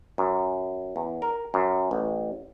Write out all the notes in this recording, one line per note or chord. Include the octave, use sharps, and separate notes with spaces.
F#2
E2
A#4
F#2
A1